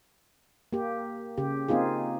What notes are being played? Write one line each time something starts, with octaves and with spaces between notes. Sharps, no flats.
A#3 G4
C#3 G4
A#3 C4 D#4 F4 G#4